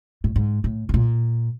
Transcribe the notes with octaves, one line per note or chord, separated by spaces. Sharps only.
A2
G#2
A2
B2
A#2